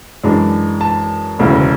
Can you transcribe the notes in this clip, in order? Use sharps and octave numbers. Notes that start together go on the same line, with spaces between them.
F#2 E3 G#3 D4
A5
E1 D2 C#3 E3